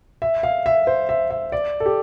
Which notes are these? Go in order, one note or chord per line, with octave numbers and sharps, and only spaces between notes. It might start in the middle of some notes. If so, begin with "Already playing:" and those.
E5
F5
E5
C5
E5
E5
D5
A4
G4